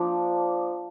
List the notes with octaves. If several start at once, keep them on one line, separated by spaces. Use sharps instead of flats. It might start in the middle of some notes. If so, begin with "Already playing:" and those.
Already playing: F3 A#3 D4